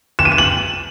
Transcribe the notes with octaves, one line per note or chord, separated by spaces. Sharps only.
E7
D#7
E7
F#7